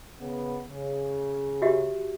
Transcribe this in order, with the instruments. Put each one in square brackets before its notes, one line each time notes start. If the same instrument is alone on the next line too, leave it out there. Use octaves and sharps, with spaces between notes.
[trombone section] C#3 B3
C#3
[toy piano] F#4 G4 E5